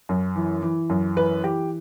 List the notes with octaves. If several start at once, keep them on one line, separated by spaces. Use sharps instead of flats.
F#2
E3
E3
F#2
E3 B4
E3 G4